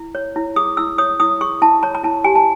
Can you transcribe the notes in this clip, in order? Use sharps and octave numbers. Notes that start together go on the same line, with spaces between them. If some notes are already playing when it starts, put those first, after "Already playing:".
Already playing: E4
C#5
E4
G#4 D#6
E4 E6
C#5 D#6
E4 D#6
G#4 C#6
E4 A5
C#5 A#5
A#5
E4 A5
G4 G#5
A5